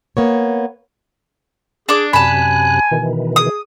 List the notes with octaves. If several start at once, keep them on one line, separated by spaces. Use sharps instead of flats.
A#3 B3 C#5
D4 G#4 D6
F#2 C3 G#5 A5 B5 F#6
B2 D#3 E3
G#4 D#6